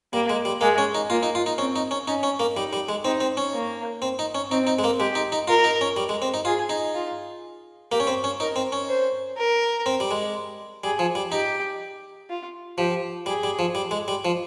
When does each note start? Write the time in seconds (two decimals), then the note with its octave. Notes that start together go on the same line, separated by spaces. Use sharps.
0.13 G3 A#3
0.30 G#3
0.45 G3
0.61 G#3 A#3
0.78 C#4
0.95 D#4
1.10 A#3 F4
1.23 D#4
1.35 F4
1.46 D#4
1.58 C4 C#4
1.76 D#4
1.91 C#4
2.07 C#4 D#4
2.23 C#4
2.40 A#3
2.56 G3 D#4
2.73 G3
2.89 G#3
3.05 C4 D#4
3.20 C4
3.37 C#4
3.53 A#3
4.02 C4
4.19 D#4
4.35 C#4
4.51 C4 D#4
4.67 D#4
4.79 G#3
4.84 A#3
5.00 G#3 G4
5.15 D#4
5.32 D#4
5.48 F4 A#4
5.64 D#4
5.81 C#4
5.96 G3
6.09 G#3
6.22 C4
6.34 D#4
6.45 F4 G#4
6.69 D#4
6.94 F4
7.91 A#3 G4
8.00 C#4
8.07 C4
8.24 C#4
8.40 D#4 A#4
8.56 C4
8.72 C#4
8.89 C5
9.37 A#4
9.86 C4
10.00 G3
10.11 G#3
10.84 G3 G#4
10.99 F3
11.15 G3
11.32 D#4 G4
12.30 F4
12.78 F3 G4
13.26 G3 G#4
13.43 G3
13.59 F3
13.75 G3
13.91 G#3
14.08 G3
14.25 F3